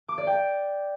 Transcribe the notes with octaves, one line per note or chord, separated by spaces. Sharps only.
D6
D5
G5